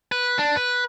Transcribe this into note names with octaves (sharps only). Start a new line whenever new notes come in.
B4
D4
B4